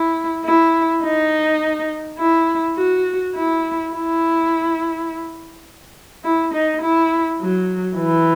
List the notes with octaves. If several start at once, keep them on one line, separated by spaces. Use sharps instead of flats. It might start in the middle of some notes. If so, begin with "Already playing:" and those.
Already playing: E4
E4
D#4
E4
F#4
E4
E4
E4
D#4
E4
F#3
E3